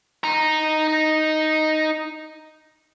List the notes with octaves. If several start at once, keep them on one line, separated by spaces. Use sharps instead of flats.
D#4 A#5